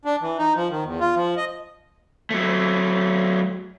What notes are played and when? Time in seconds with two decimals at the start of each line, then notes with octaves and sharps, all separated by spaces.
0.05 D4
0.22 E3
0.39 D#4
0.55 F3
0.69 D#3
0.84 E2
1.00 F4
1.15 F3
1.37 D#5
2.30 F#3 A3